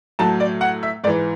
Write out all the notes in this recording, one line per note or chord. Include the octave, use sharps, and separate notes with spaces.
A2 F#3 A5
D5
F#5
E5
G#2 E3 D5